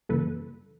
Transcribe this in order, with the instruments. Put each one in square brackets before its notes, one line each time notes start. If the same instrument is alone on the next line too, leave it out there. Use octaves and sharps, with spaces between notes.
[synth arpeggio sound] F#2 C#3 E3 G3 A#3 A4 B4